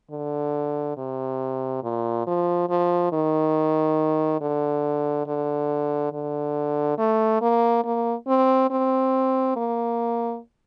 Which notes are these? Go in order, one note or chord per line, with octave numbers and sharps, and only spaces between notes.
D3
C3
A#2
F3
F3
D#3
D3
D3
D3
A3
A#3
A#3
C4
C4
A#3